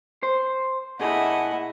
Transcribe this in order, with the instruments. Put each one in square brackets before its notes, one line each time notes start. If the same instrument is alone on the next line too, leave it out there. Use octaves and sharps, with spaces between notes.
[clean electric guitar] C5
[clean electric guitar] A#2 G#4 A4 [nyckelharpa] E4 D#5 [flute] F#5